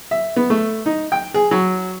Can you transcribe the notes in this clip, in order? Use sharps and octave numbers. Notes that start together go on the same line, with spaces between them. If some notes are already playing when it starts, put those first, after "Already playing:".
E5
B3
A3
D#4
G5
G#4
F#3